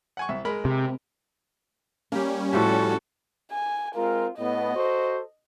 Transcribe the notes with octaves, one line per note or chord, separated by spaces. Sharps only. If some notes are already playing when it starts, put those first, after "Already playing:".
F#5 G#5 C#6
C2 E5
G#3 A#4 B5
C3
G3 A#3 C#4 G4
A2 F3 F#4 G4 A4
G#5
G#3 C4 F4 A#4
A2 B3 D#5
F#4 A4 C5